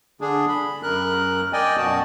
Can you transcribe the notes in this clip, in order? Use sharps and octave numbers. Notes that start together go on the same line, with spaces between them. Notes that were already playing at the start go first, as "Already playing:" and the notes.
D3 D4 G#4
B5
F#2 A#4 F#6
D5 D#5 G5 G#5
F#2 B2 F#4 A5